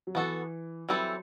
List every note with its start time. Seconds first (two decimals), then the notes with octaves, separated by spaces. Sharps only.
0.07 F#3
0.15 E3 B3 F#4 A4
0.89 E3 F#3 G3 C4 E4 A4